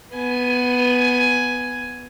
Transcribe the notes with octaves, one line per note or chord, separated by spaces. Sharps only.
B3 G#5